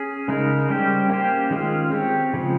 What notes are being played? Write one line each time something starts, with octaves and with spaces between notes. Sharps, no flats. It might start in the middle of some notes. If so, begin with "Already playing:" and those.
Already playing: C#4 G#4
C#3 G#3 D#4 A#4
G3 C#4 G4 C5
A#3 C#4 G4 C5
D#3 G#3 C#4 F4
C4 G4 C#5
C#3 F3 G#3